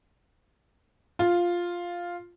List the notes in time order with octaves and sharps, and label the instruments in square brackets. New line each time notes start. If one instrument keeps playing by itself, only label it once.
[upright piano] F4